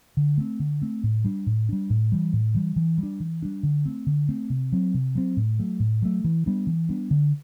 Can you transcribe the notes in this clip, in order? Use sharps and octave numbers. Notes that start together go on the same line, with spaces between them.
D3
A3 C4
D3
A3 C4
A2
G3 D4
A2
G3 D4
A2
E3 G3
A2
E3 G3
E3
G3
D4
E3
G3 D4
D3
A3 C4
D3
A3 C4
C3
F#3 C4
C3
F#3 C4
A2
F#3 A3
A2
F#3 A3
E3
G3 B3 D4
E3
G3 B3 D4
D3